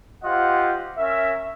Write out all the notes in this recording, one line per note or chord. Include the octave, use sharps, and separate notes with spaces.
F4 G4 C5 D#5 F#5
C#4 A#4 E5